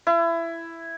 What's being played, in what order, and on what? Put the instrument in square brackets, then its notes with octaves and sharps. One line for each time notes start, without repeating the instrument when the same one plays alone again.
[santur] E4